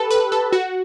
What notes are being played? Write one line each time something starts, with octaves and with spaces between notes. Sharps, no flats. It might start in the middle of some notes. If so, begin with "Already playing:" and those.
Already playing: G4 A4 B4
B4
A4
F#4